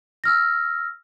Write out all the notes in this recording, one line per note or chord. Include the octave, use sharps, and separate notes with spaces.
E6 F6 A#6